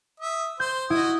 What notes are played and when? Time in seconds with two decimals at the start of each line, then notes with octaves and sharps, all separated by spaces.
0.20 E5 D#6
0.60 C5 G6
0.90 E4 F#4 D#5 D#6